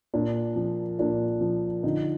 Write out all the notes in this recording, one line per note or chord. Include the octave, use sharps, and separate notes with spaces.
A#2 D4
F3
A#2 D4
F3
D3 D#4